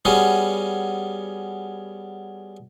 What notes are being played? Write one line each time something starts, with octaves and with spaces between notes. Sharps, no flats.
G3 B3 C#4 F#4 G#4